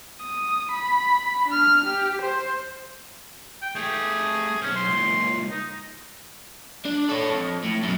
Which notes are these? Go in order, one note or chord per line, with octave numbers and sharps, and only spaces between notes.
D#6
B5
D4 F6
G4
C5
G5
A3 G4 G#4
B1 C#4 C5
C6
C#2 A#2
D#4
D4
A4 C#5
F2
A2
F#2 B2